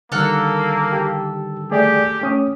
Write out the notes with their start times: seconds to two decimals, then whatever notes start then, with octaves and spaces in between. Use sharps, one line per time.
0.12 D3 D#3 G3 A#3 A4 F#5 F6
0.92 G4
1.71 A3 G4 G#4 D5
2.22 A3 C#4 D#6